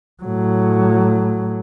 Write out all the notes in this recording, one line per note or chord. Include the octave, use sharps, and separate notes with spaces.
A2 F#3